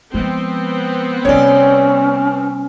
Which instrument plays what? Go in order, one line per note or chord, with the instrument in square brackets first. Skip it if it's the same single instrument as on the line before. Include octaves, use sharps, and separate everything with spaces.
[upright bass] F3 G#3 [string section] B3 C4
[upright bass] C3 G3 [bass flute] C#4 [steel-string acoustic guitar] C#5 D5